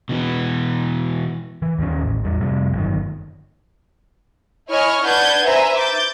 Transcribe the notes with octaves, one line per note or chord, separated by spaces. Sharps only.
B2 E3
E3
D#2 D#3 C#4
A1
E2 G3
F2 C3 G3
G1 F#2 D#3
E4 C#5 D#5 G#5 C#6 F6
D4 B4 F#5 A5 G6 G#6
B4 C5 E5 G#5 A#5
D6 G6 A6